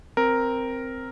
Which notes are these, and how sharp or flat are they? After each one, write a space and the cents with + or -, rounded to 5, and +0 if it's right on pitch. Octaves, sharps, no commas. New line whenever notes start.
C4 +0 A#4 +0